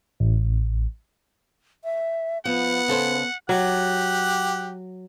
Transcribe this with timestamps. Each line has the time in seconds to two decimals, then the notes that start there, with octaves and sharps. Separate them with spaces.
0.20 A1
1.84 E5
2.45 F3 B3 F#5
2.88 C#3 A4 C5
3.49 F#3 G4 F#5